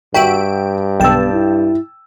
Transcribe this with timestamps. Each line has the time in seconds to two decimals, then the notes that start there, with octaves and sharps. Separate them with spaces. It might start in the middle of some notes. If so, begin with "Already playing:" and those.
0.14 G2 F#4 E5 G5 D7
1.00 B1 B3 G5 A5 E6
1.32 E4